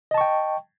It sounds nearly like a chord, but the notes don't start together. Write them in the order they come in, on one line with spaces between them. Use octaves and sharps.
D#5 A5 C#6 G5